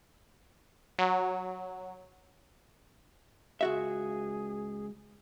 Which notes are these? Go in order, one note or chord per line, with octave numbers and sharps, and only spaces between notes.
F#3
C#2 F#4 G#4 E5